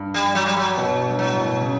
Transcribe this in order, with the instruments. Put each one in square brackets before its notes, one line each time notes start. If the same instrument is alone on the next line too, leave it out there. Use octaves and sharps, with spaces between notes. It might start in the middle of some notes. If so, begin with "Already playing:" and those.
Already playing: [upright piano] G2
[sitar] G3
F#3
G3
F#3
[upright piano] B2
G2
[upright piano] A2 [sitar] F#3
[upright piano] B2
C#3